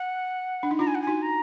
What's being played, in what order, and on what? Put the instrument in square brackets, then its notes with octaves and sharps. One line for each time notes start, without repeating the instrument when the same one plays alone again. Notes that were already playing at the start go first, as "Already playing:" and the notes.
Already playing: [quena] F#5
[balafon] D4
D#4
[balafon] D4 F4 [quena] A#5
[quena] G#5
F#5
G#5
[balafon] D#4 F#4
[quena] A#5